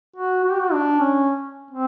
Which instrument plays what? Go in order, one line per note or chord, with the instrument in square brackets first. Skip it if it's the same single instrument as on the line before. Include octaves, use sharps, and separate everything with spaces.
[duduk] F#4
F#4
G4
F#4
D4
C#4
C4